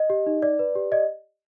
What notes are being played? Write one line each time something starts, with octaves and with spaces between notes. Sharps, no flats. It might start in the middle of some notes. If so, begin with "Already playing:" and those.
Already playing: D#5
G4
D#4
D5
B4
G4
D5 D#5